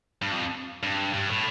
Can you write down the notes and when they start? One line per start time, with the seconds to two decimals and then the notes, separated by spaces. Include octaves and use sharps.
0.22 G2
0.32 F2
0.83 G2
1.14 G2
1.29 A2